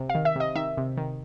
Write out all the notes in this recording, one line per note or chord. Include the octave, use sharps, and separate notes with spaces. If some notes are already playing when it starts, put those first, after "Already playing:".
Already playing: C3
F5
D#3
E5
C3 D#5
D#3 E5
C3
D#3